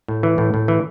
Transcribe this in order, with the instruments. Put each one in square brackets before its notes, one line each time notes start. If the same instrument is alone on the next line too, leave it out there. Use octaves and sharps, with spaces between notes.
[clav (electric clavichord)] A2
E3
A2
A2
E3